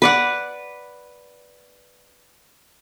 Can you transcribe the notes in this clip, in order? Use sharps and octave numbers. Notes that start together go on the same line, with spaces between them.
B4 D5 F#5